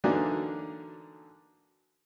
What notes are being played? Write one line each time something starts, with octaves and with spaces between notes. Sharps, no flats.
D3 E3 F#3 A#3 D4 D#4